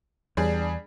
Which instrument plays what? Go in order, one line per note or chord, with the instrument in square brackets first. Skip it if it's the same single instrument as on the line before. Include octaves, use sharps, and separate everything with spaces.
[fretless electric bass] E2 [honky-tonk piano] G3 D4 G#4